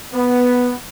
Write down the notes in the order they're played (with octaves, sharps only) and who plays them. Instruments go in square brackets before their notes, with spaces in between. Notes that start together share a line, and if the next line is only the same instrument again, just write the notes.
[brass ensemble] B3